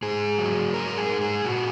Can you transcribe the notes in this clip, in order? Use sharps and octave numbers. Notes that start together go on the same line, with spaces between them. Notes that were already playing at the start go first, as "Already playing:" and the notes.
G#2 G#4
F#3
G#2 A#4
G#4
G#2
G#4
A#2 F#4